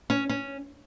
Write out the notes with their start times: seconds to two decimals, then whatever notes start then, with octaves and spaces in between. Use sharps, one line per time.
0.10 C#4
0.29 C#4